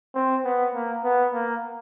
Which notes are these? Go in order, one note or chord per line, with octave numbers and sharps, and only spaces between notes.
C4
B3
A#3
B3
A#3